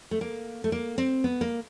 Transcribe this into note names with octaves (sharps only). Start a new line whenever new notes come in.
A3
A#3
A3
A#3
C4
B3
A#3